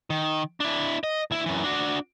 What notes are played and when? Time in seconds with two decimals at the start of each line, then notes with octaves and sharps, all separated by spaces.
0.10 D#3
0.60 D4 E4
1.04 D#5
1.31 D2 E4
1.46 F#2 E3
1.64 D4 F#4